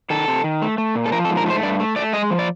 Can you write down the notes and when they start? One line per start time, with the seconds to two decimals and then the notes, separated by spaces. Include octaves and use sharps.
0.10 D#3 A4
0.28 C3
0.44 D#3
0.62 A3
0.78 A3
0.95 A#2
1.06 A4
1.12 F3 A#4
1.25 A4
1.29 G#2
1.37 A#4
1.46 A3 C5
1.63 G2 D5
1.80 A3
1.96 A3 D5
2.13 G#3 D#5
2.31 F3
2.39 D5